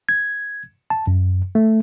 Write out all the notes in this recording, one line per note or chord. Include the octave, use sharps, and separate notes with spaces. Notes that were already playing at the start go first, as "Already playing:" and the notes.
G#6
A5
F#2
A3